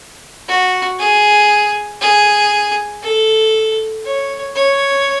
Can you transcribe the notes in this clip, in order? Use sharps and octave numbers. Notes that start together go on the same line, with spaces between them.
F#4
G#4
G#4
A4
C#5
C#5